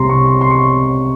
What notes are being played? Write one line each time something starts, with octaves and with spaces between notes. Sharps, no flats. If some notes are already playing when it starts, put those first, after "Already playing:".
Already playing: C2 C3 G3 A#5 C6
C#6
C6
C6
C#6